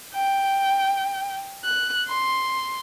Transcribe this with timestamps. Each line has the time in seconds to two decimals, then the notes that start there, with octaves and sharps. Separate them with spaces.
0.14 G5
1.64 F#6
2.08 C6